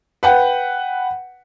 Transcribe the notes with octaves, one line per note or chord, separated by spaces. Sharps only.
B4 F#5 G5